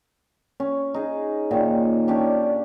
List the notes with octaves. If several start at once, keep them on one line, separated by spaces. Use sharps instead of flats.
C#4
D#4 G#4
A#2 D#3
C#4 D4 G4